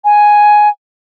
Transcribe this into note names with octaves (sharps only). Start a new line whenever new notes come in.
G#5